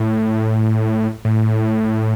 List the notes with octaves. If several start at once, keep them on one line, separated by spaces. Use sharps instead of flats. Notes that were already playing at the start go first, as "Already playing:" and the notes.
Already playing: A2
A2